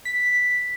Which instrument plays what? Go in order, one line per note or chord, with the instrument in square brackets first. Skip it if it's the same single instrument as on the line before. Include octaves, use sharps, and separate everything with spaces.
[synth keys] B6